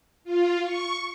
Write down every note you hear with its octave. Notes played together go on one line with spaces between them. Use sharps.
F4
C#6